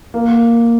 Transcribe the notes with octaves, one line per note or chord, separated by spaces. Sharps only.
A#3